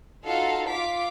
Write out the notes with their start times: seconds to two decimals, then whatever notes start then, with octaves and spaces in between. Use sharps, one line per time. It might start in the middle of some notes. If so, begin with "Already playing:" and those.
0.25 D#4 F4 F#4 A4 F5
0.68 F4 F5 D6 B6